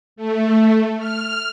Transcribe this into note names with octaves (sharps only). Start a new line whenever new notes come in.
A3
F6